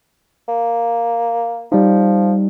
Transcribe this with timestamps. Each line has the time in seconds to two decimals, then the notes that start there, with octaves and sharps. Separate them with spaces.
0.49 A#3
1.72 F3 G3 D#4